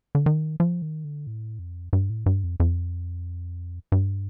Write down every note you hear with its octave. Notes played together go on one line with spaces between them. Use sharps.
D3
D#3
F3
D#3
D3
A2
F2
G2
A2
G2
F2
F2
G2